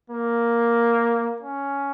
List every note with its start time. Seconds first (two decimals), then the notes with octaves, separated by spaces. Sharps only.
0.10 A#3
1.42 C#4